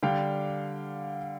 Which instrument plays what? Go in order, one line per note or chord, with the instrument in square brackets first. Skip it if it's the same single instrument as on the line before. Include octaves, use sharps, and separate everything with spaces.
[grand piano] D3 G3 F5 G5